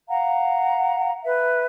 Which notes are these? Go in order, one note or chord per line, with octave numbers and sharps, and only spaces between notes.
F5 F#5 A#5
B4 E5